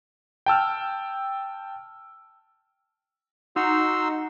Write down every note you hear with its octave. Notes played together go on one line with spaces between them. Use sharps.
G5 A5 E6 F6
D#4 F#4 C6 E6